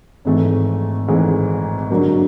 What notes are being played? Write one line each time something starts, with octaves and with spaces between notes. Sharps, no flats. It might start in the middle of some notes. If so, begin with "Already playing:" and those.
G#1 G#2 E3 A3
G#1 G#2 E3 A3
G2 D3 F#3 A#3